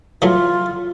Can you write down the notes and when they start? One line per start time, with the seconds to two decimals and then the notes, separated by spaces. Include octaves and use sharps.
0.22 E3 F#3 A3 F4